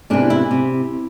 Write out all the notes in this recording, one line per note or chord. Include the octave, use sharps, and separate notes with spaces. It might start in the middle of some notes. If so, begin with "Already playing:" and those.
E2 C3 E3 D4
E4
C3